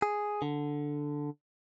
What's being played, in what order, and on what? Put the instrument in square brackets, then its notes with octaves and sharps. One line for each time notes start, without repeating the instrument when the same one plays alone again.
[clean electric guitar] G#4
D3